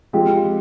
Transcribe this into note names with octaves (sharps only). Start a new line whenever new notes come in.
F3 G#3 C4 G4